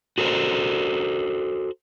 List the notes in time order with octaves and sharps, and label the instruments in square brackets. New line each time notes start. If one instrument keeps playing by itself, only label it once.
[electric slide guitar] F#4 A4 A#4 C5